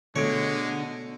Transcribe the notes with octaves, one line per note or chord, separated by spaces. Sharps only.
B2 D3 G#3 A3 C#5 D7